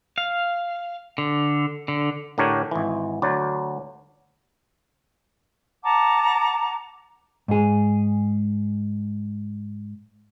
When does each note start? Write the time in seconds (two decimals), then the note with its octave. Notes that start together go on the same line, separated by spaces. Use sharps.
0.18 F5
1.18 D3
1.88 D3
2.38 A2 D3 D4 G4 A#4 C#5
2.71 G#1 E3
3.22 D2 F#3 D5
5.84 F#5 A5 A#5 D6
7.48 G#2 G#4